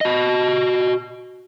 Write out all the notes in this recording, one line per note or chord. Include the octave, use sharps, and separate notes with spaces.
F#4 D#5